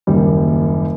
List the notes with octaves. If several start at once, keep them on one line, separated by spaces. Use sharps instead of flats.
F#1 D#2 G3